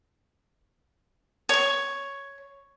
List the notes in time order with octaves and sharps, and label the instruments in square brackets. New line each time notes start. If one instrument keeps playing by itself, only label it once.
[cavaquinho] C#5 C#6